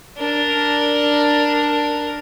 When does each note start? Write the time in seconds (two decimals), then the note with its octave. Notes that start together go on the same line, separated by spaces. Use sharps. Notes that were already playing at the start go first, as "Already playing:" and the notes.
0.18 D4 A#4